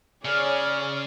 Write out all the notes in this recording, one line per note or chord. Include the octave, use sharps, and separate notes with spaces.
C#3 G#4 C#5 D5 F6